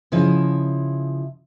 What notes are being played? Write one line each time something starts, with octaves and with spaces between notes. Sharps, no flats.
C#3 F3 E4 D#5